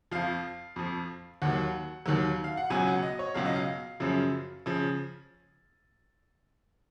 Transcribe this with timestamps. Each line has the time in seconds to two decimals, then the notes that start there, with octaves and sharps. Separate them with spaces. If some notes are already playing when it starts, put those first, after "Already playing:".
0.11 F2 F3 F5
0.76 F2 F3
1.42 D#2 D#3 F#3 F#5
2.06 D#2 D#3 F#3
2.44 F5
2.57 F#5
2.70 C#2 B2 F#3 G#5
2.87 F#5
3.03 D#5
3.19 C#5
3.34 C#2 B2 F#3 F5
3.45 D#5
3.56 F5
4.00 F#2 C#3 F3
4.66 C#3 F3